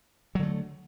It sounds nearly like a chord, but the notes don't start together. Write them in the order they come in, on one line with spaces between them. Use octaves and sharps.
F#3 D3 A3